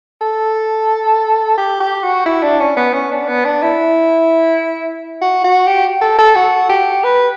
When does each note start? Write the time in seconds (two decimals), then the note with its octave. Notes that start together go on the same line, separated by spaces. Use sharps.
0.21 A4
1.57 G4
1.80 G4
2.03 F#4
2.26 E4
2.42 D4
2.60 C#4
2.77 B3
2.93 C#4
3.11 D4
3.28 B3
3.45 D4
3.62 E4
5.21 F#4
5.44 F#4
5.67 G4
6.01 A4
6.18 A4
6.35 F#4
6.69 G4
7.04 B4